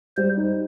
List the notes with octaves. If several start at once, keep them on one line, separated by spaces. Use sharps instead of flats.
G3 C5
D#4